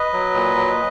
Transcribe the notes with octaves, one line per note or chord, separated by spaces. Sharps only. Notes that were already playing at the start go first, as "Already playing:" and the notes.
Already playing: B4 D#5
F#3
A#2
F#3